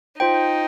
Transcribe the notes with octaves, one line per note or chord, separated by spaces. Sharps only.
D#4 F4 C5 G5